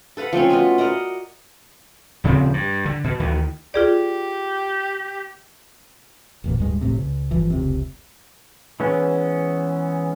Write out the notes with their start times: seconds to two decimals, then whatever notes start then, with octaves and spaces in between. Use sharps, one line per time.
0.17 A4 B4 F5 F#5
0.33 F3 A3 C4 C#4
0.49 B2 B3 F4 F#4
0.78 A#4 D5 D#5 F#5
2.24 D#1 C#3 F3 C4
2.53 G2
2.85 D3
3.04 B2
3.20 D2 D#3 E3
3.74 F4 G4 G#4 D5
6.44 F#1 E2 A#2
6.58 D1 G2 G#3
6.81 G#1 F2 A2 C3
6.98 C#2
7.31 G1 E3 F3
7.50 F1 C#2 C3
8.80 E3 G#3 B3 C#4